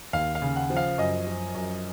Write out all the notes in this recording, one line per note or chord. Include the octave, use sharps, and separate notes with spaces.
D#2 F5
F5
C#3
F#5
F3
F5
F#2 D#5
F3
F#2